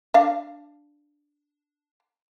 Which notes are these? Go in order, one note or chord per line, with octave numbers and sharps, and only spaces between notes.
D4 F5